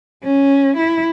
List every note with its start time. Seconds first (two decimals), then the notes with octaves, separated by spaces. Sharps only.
0.24 C#4
0.77 E4